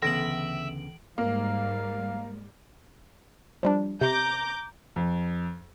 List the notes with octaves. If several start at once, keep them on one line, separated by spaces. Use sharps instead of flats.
D2 C#3 E3 B3 E5 A#6 D7 F#7
G#2 G3 G#3 A#3 F5
F3 G3 D4
C3 A#5 D6 G6
F2